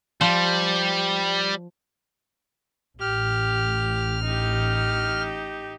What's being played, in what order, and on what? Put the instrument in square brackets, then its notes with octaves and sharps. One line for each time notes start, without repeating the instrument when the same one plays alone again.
[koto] F3 C5 [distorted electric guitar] G3
[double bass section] A1 [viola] G4 [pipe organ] F6
[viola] D#4 G4